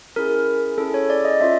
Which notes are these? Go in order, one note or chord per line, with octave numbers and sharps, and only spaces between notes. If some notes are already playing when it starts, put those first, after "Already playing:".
C#4 E4 G#4 A#4
C#4 E4 G#4 A4
C#5
D5
D#5
C#4 F4 A4 E5